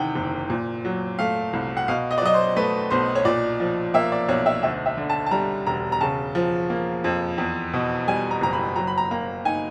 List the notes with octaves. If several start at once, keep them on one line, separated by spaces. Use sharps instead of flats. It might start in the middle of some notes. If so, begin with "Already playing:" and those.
Already playing: E2 C3 D#3 F#5 G5
F#1
A#2
F#3
A3 F5
C2
F#5
B2 F5
D#5
D5
F#3 D#5
C5
A3 B4
B1 C5
C#5
A#2 D5
F3
A#3 E5
D5
B1 C#5
E5
D2 E5
E5
D3
A5
A5
G3 A#5
E1 A#5
A#5
C#3 A5
F3
A#3
F2
E2
B2
G3 G#5
A#5
F#1 A#5
B5
F#3 A#5
B5
A#5
A#3 A#5
D#4 G#5